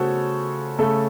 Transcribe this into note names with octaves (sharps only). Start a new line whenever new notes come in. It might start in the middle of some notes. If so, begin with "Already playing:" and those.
Already playing: C#3 A3 F#4 A4 C5 C#5
C#3 A3 A4